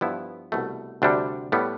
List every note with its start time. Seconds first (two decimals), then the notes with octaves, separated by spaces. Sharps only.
0.01 G2 F3 B3 E4
0.52 C2 B2 A3
1.02 D2 C3 G3 D4
1.52 A2 G3 B3